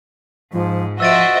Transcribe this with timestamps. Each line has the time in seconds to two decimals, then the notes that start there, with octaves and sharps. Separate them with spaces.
0.53 G#2 F3
1.00 F3 F#4 C5 D#5 E5 E6 A6 D7